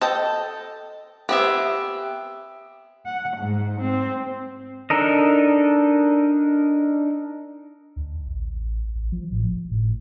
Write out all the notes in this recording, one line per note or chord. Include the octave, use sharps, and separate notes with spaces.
A4 D#5 G5 A5
B3 C4 G4 G#4 E5
F#5
G#2
C4
D4 D#4 A4 A#4 D#5
D2
A1
A1
F3
A2
G#1
A2